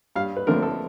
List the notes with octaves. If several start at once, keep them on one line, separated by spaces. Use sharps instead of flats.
G2 F5
B4
D3 F3 A3 C4 A#4
A4